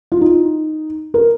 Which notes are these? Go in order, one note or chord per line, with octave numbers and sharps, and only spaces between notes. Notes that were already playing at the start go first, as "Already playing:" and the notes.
F4
D#4
A#4